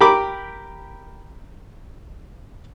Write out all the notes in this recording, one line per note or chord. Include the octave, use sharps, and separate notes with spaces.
G4 A#4 B5 D6